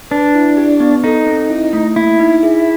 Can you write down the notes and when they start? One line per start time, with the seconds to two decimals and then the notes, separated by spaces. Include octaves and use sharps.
0.11 D4 B4
0.35 E4
0.57 G4
0.80 B3
1.04 D#4 A4
1.26 C4
1.50 E4
1.73 A3
1.96 A#3 E4
2.19 D#4
2.43 G#4